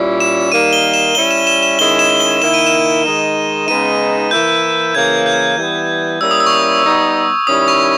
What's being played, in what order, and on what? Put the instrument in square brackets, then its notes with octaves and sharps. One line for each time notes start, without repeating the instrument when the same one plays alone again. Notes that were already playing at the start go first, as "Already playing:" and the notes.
Already playing: [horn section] A#2 G3 C#4 E4
[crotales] E7
[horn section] D#3 G3 A#3 D#4 [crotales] D#7
[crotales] G7
E7
[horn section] G3 C#4 E4 [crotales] G7
[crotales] E7
E7
E7
[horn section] D#3 G#3 C#4 E4 [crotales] G7
[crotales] E7
G7
[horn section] D#3 A#3 E4 [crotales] E7
[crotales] D#7
E7
[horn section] D#3 G#3 D#4
[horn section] C#3 G#3 B3 D#4 [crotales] D#7
[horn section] E3 A#3 E4 [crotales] G6
[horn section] C#3 E3 A#3 [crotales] G#6
[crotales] G6
[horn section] E3 G3 B3
[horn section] G3 A#3 C#4 E4 [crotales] E6
[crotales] D#6
E6
C#6
D#6
[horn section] G3 B3 D#4
[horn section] D#3 G3 C#4 E4 [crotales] D#6
[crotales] C#6